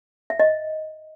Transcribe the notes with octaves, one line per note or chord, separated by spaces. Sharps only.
E5
D#5